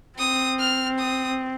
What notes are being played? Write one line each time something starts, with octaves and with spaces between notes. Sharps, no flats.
C4 D#6
F6
D#6